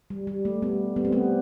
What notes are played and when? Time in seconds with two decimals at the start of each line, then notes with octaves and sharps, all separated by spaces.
0.10 G3
0.27 G3
0.45 A3
0.62 G3 B3
0.96 G3 B3
1.05 A3 C4
1.12 G3 B3